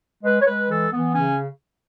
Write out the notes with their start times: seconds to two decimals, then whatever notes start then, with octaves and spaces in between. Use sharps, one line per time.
0.23 G#3 B4
0.40 C#5
0.46 G#3 B4
0.69 E3 A4
0.91 E3 B3
1.13 C#3 C#4